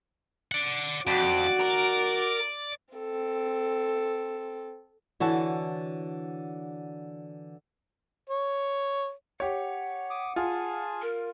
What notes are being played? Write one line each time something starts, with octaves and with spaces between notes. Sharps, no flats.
D5 F#5
F2 F#4 D5
A#4
C4 A4
D3 E3 F#4 C#5 A5
C#5
G4 C#5 F#5
D6 D#6
F4 G#4 G#5 A5
A#4